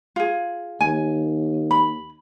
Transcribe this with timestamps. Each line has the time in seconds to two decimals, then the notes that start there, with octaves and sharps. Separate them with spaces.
0.16 F4 G#4
0.81 D#2 G#5
1.71 B5